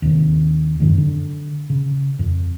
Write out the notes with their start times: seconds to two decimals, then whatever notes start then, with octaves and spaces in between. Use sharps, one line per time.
0.02 D#2 C3
0.80 F#2 C3 D#3 G#3
0.98 D3
1.70 C#3
2.19 F2